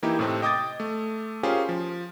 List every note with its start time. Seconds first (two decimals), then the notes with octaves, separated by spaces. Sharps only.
0.02 E3 A#3 D#4 E4 G4
0.19 A2 C3 A3 C4
0.42 D#5 G5 D6 D#6 G#6 A6
0.80 A3
1.43 C#4 F4 G4 G#4 A#4 C5
1.69 F3